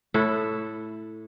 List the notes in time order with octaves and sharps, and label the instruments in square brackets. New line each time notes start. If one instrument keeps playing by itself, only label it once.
[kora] A2 E4 A4 E5